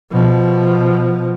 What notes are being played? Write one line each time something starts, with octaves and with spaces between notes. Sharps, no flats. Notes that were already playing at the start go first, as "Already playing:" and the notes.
B2 F3